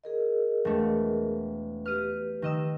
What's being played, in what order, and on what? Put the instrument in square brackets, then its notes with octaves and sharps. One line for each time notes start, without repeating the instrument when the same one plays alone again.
[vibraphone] G#4 A#4 D#5
[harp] E1 A3
[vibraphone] G4 B4 [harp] F6 D#7
[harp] D#3 D#5 E6